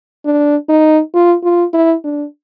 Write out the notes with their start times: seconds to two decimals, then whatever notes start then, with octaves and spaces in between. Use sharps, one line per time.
0.25 D4
0.69 D#4
1.14 F4
1.44 F4
1.74 E4
2.04 D4